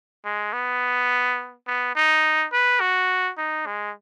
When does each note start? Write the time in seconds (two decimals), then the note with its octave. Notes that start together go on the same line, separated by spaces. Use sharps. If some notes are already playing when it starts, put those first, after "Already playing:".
0.25 G#3
0.53 B3
1.67 B3
1.95 D#4
2.52 B4
2.80 F#4
3.38 D#4
3.66 G#3